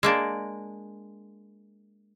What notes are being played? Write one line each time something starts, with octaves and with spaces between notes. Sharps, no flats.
G#3 A#3 D4